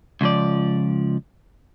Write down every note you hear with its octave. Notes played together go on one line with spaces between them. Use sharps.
C#2 F3 D5